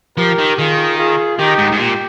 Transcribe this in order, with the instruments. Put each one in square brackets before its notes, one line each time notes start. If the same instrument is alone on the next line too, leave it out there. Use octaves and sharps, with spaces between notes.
[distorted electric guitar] F3 [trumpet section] G4 A#4
[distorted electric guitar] D#3
[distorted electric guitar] D#3 [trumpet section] F4 G#4
[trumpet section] F4 G#4
[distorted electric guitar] D#3 [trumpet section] D#4 G4
[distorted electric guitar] G#2
G#2
[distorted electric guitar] A#2 [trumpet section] G4